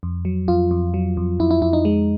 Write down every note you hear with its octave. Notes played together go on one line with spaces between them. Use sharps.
F2
F#3
F2 F4
F2
F#3
F2
F2 E4
E4
F2 E4
D#4
G#3